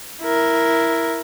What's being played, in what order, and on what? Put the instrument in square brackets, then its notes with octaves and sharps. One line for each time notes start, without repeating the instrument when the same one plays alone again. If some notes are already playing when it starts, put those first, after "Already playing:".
[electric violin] E4 A#4